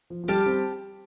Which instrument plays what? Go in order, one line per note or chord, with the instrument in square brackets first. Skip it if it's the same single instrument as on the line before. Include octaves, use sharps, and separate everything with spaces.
[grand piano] F3
F3
[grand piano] G3 [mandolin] G4 F5 A5
[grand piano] G3 C4